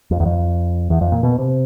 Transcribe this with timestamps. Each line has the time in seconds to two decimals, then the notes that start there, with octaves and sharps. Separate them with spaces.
0.11 F2
0.20 E2
0.26 F2
0.90 E2
1.01 F2
1.12 A#2
1.23 B2
1.39 C3